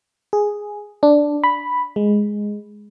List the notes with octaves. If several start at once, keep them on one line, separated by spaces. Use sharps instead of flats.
G#4
D4
B5
G#3